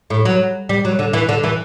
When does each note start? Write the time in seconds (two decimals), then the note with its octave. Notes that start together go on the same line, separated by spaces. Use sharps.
0.10 A2
0.25 F#3
0.69 G3
0.85 F#3
0.99 D3
1.13 E3
1.29 D3
1.44 E3